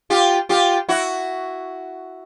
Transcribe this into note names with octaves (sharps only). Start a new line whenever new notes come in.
F4 G4
F4 G4
E4 F#4